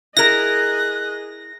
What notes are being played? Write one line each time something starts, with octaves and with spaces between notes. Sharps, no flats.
E4 G#4 A#4 D#5 F#6 A#6